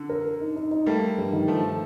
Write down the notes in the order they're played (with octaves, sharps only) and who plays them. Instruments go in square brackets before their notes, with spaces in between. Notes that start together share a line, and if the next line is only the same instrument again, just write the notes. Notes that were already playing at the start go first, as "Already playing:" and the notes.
Already playing: [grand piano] D3
[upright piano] A#4
A#4
D#4
D#4
D#4
[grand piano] G3 A#3 [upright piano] A3
[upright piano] A3
G2
D#3
[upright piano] G2 [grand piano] F3 A3